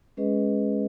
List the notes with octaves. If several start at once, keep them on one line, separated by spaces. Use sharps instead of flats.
G#3 C#4 G#4 B4 D#5